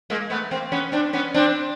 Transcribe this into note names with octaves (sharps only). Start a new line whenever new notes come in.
G#3 A#3
A3 B3
A#3 C4
B3 C#4
C4 D4
B3 C#4
C4 D4